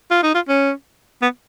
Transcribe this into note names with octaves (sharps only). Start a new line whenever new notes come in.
F4
D#4
F4
C#4
B3